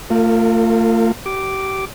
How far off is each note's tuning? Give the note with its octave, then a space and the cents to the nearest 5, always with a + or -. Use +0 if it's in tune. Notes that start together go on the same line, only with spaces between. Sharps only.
A3 +40 F4 +0 A#4 -35
G4 -35 D6 +0